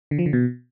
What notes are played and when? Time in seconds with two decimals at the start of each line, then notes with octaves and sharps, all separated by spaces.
0.11 D3
0.19 F3
0.26 D3
0.33 B2